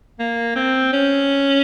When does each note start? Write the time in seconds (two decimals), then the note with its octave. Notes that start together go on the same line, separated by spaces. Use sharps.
0.19 A#3
0.56 C4
0.93 C#4